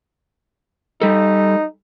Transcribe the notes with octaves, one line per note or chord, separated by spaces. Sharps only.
G3 D#4 A4